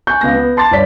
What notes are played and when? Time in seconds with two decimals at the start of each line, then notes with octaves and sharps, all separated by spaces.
0.07 G#5 C#6 F#6 G6
0.21 C#2 B3 A#6
0.36 B3
0.57 A5 C6 D6 A6
0.71 G1 C#5 D5 B6